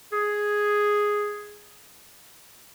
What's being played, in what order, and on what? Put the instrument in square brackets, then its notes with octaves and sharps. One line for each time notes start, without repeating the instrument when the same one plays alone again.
[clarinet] G#4